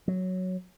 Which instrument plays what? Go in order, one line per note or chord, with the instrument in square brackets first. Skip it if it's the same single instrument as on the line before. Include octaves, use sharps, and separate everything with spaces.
[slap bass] F#3